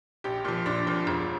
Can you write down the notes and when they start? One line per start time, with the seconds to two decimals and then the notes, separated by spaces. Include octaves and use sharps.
0.24 A#1 G4
0.45 A#2 F3
0.66 A#1 D4
0.87 A#2 F3
1.07 E1